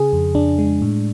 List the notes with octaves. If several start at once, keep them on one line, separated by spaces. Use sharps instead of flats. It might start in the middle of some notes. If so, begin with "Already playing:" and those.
Already playing: C#3 G#4
F2
F2 D4
G#3
A2